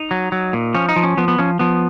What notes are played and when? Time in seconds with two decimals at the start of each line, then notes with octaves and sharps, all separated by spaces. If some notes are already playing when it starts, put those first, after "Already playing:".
Already playing: D#4
0.11 F#3
0.32 F#3
0.53 A#2
0.74 F3 C#4
0.89 D#4
0.96 F3
1.03 C#4
1.17 F3 B3
1.28 B3
1.38 F3 C#4
1.59 F3 B3